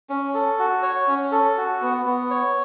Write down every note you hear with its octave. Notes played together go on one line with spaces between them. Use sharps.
C#4
A4
F#4
C#5
C#4
A4
F#4
B3
B3
C#5